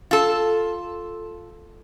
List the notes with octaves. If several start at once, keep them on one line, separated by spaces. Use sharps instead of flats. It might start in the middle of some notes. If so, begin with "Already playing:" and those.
F4 A4